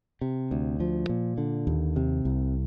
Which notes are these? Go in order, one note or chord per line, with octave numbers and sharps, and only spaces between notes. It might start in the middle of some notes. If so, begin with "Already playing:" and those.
C3
D2
F3
A#2
D3
D#2
C3
C2